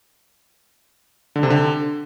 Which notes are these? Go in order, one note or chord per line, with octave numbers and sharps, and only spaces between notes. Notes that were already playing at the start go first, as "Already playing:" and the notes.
D3
C3
D3